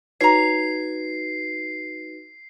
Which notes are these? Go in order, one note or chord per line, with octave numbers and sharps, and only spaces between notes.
D#4 F#4 B4 C#5 A#5 C7